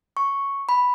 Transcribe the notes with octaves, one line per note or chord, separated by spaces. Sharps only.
C#6
B5